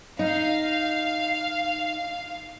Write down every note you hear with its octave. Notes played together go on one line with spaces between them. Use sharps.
D#4 F5